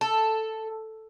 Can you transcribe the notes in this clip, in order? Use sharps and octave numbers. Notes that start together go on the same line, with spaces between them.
A4